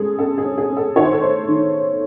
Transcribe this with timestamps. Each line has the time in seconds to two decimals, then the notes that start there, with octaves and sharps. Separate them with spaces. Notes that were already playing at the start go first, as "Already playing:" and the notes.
Already playing: C#3 G#3 G#4 A4
0.18 C#3 A4
0.38 G#4
0.44 C#4
0.58 G#4
0.70 C#4
0.77 A4
0.96 D#3 C#5
1.04 C5
1.12 A4
1.21 A3 C5
1.48 D#3